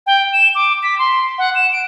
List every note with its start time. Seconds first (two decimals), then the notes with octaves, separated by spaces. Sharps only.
0.06 G5
0.33 E7
0.55 D6
0.83 B6
0.98 C6
1.38 F#5
1.55 E7
1.72 D7